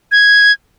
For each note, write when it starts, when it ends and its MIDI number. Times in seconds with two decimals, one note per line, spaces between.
0.12 0.52 92